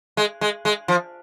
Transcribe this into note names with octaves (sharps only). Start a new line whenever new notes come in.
G#3
G#3
G#3
F3